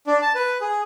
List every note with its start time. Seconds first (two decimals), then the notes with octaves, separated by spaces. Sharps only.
0.07 D4
0.22 A5
0.35 B4
0.61 G#4